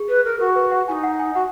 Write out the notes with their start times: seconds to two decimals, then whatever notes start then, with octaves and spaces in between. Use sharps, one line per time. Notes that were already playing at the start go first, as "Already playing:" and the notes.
Already playing: G#4
0.09 B4
0.24 A#4
0.39 F#4 A#4
0.56 B4
0.71 F#5
0.88 D#4 E4 G#5
1.03 F#5
1.19 G#5
1.35 F#4 F#5